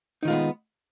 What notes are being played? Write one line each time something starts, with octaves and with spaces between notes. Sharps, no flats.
D#3 G#3 B3 D#4 F4